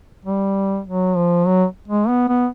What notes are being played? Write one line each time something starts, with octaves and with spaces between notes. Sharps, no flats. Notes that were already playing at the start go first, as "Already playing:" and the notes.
G3
F#3
F3
F#3
G#3
B3
B3